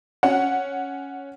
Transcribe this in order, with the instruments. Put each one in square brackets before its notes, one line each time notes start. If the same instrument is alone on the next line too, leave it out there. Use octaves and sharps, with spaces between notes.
[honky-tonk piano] C#4 F#5